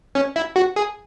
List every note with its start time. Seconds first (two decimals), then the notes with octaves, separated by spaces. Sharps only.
0.15 C#4
0.36 E4
0.56 F#4
0.76 G#4